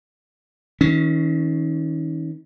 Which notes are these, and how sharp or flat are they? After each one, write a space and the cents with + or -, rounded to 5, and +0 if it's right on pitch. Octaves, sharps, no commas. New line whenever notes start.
D#3 +40 C#4 +0